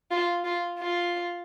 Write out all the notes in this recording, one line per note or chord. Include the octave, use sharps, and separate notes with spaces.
F4
F4
F4